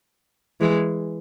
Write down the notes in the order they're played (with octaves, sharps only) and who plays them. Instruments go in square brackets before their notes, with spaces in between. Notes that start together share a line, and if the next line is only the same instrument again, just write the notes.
[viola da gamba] E3 G#3